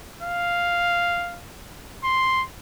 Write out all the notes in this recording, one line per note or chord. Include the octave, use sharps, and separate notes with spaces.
F5
C6